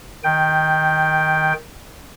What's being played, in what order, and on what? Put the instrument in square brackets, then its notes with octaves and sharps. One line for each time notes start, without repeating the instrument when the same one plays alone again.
[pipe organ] D#3 G5